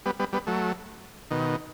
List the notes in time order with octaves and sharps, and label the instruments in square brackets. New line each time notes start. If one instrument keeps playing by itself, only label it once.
[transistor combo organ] G3 B3
G3 B3
G3 B3
F#3 A3
B2 D#3